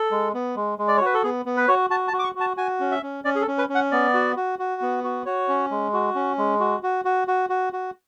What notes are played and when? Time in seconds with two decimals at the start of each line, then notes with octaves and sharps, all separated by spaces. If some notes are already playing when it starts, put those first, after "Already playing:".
Already playing: A4
0.11 G#3
0.34 B3
0.56 G#3
0.79 G#3
0.88 D5
0.97 C#5
1.01 F#4 B4
1.14 A4
1.23 B3 G#4
1.45 B3
1.57 B4
1.68 F#4 C#5
1.90 F#4 A5
2.08 A5
2.13 F#4
2.19 D6
2.24 C#6
2.35 F#4
2.40 A5
2.57 F#4 G#5
2.80 C#4
2.91 E5
3.03 C#4
3.24 C#4 D5
3.35 G#4
3.42 A4
3.48 C#4
3.58 B4
3.69 C#4
3.75 F#5
3.91 B3 D5
4.14 F#4
4.36 F#4
4.59 F#4
4.82 B3
5.04 F#4
5.26 F#4 C#5
5.49 C#4
5.71 G#3
5.93 F#4
6.15 C#4
6.38 G#3
6.60 F#4
6.83 F#4
7.05 F#4
7.28 F#4
7.50 F#4
7.73 F#4